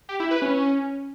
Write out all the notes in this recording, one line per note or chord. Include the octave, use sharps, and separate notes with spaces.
G4
E4
B4
C#4